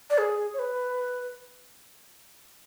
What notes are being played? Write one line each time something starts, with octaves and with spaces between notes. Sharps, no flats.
D5
G#4
C#5
B4